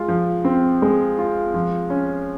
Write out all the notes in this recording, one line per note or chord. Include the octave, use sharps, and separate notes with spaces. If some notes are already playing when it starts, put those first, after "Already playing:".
Already playing: G#3 F4
F3
C4
G#3
F4
F3
C#4